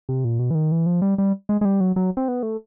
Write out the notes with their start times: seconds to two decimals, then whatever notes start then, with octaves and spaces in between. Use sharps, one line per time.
0.09 C3
0.25 A#2
0.39 B2
0.51 E3
0.55 D#3
0.72 E3
0.86 F3
1.02 G3
1.18 G3
1.49 G#3
1.61 G#3
1.65 G3
1.81 F#3
1.96 F#3
2.17 C4
2.28 B3
2.43 A3